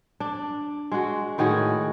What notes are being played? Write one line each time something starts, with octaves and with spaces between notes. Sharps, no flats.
D4
G#3 F#4
A2 D#3 F#4 G#4